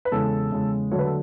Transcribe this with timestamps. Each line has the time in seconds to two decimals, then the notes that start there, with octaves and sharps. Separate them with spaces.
0.05 B4
0.12 E2 C#3 G#3 A4
0.51 E2 C#3 G#3
0.91 D3 F#3 A3 D4 C#5
0.99 B4
1.06 A4